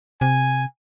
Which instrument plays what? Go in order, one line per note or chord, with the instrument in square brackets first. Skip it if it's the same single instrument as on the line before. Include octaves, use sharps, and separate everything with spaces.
[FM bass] C3 [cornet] G#5